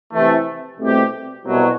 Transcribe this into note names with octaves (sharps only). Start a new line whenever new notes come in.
C3 E3 A3
C2 B2 A3 C4 G4
C2 B2 F#3